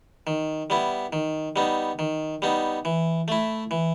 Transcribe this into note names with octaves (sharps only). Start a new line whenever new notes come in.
D#3
G3 B3 E4
D#3
G3 B3 D#4
D#3
G3 B3 D#4
E3
A3 E4
E3